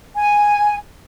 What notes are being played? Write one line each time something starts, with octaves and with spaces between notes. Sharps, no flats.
G#5